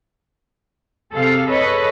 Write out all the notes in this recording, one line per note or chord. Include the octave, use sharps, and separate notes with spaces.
C3 G#4 A4 F5
G#4 A4 B4 C#5 D#5